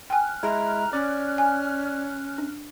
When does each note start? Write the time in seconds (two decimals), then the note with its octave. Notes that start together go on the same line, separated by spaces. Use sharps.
0.10 G5 G#5 F6 F#6
0.43 G#3 E4 A#5
0.93 C#4 D5
1.38 G#5
2.38 D4